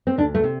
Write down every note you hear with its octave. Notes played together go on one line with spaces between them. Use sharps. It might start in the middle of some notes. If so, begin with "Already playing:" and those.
C4
D2 D4
A3
C3